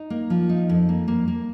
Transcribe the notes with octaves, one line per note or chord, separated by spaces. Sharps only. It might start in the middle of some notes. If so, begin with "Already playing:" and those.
Already playing: D#4
A#3
F3
D#4
F2
A#3
A#3
A#3